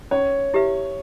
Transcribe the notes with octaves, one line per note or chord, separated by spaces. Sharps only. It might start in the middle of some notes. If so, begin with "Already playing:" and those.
C#4 C#5
E4 G4 B4 E5